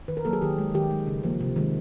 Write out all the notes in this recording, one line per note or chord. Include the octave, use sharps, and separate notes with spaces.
D#3 B4
A#4
F#3 A#3 A4
G#4
D#3 G4
G#3
D#3 G4
G#3
C#3
F3 A#3
C3
D#3 G#3